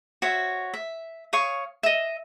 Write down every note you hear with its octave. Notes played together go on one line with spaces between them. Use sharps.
F#4 C5 C#5 E5
E5
C#5 F5 C#6 D#6
D#5 E5